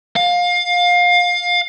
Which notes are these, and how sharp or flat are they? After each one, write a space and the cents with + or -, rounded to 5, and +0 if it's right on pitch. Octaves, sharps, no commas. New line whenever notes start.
F5 +25